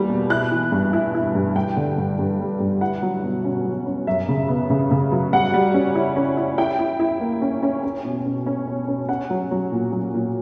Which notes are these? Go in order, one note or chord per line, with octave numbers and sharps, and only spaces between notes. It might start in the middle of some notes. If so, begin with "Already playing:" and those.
Already playing: E2 G3 A#3
B2
E4 F#6
E3
G2
E4
E4
G2
G2 G5
D3
G2
G2
G3
G2
E4 F#5
F#3
B2
C#4
F#3
C#4
F#2 E5
C#3
B3
C#3
C#3
F#3
G3 F#5
G3
C#4
E4
C#4
E4
E4 G5
E4
E4
A#3
C#4
C#4
C#4
B2
C#4
C#4
B2
C#4
C#4 F#5
F#3
F#3
A#2
F#3
A#2